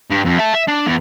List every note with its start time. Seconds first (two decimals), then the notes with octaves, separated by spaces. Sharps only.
0.10 G2
0.25 F2
0.39 E5 A5
0.54 E5
0.68 D4
0.86 E2